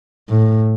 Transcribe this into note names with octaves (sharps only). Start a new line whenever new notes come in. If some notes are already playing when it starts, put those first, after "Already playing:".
A2